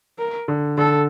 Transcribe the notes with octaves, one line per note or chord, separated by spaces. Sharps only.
A#4
D3
D3 A4